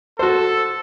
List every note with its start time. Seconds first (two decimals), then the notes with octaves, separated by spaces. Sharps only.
0.19 F#4 A4 C5